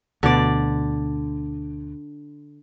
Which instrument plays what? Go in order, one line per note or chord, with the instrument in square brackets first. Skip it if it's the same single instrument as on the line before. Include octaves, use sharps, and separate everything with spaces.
[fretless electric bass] D2 B2 [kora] D3 D5